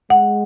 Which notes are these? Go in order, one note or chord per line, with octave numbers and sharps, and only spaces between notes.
G#3 F#5